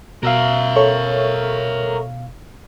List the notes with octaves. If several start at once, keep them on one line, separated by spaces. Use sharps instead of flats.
B2 A#4 E5 F5
A4 C#5 C#6